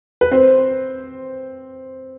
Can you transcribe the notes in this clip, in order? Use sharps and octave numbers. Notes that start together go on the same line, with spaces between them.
B4
C4 C5